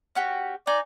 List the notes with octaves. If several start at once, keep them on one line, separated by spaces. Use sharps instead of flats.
C#4 F#4 G4
D#4 D5 G#5